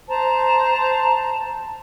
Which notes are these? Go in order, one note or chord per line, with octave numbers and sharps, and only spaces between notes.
C5 A5 A#5